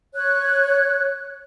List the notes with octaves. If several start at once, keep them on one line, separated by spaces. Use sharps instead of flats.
C#5 F#6